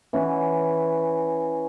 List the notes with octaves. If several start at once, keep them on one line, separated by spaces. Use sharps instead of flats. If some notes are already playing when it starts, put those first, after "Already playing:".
E3 C#4 E4 F#5